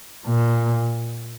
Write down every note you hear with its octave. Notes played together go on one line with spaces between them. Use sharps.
A#2